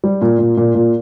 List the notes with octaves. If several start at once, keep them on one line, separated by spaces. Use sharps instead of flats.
G3
A#2
A#2
A#2
A#2